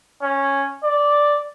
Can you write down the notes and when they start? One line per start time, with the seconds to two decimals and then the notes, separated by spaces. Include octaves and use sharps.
0.22 C#4
0.84 D5